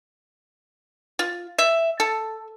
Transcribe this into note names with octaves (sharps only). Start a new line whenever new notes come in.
F4
E5
A4